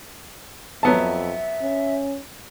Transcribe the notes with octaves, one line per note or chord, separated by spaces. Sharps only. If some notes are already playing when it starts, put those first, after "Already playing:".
F2 F#3 B3 E5 A5
C#4